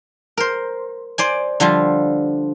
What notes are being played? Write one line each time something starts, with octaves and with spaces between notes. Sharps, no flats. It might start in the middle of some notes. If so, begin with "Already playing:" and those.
A#4 C5
C5 D5 G#5
D3 F3 G3 F4